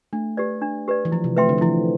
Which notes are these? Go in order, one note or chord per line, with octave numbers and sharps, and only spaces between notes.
A3 D4
G4 B4 D5
D4
G4 B4 D5
E3
F3 E4
C3
A3 B4 E5 G5 C6
D3
F3
E3 E4